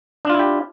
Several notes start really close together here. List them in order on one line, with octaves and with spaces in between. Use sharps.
D4 F4 E4 G4